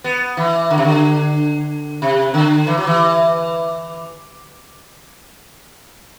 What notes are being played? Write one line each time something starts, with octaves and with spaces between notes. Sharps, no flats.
B3
E3
D3
C3
D3
C3
D3
E3
F#3
E3